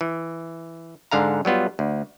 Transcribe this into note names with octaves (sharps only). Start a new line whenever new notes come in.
E3
G#2 D3 F5 A#5
F#3 G3 B3 F4
D2